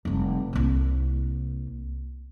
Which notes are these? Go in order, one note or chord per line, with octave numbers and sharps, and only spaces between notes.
F1 G3
C2 A#3